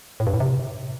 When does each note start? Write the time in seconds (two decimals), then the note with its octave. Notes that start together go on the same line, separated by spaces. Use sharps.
0.20 A2
0.27 G2
0.34 A2
0.40 C3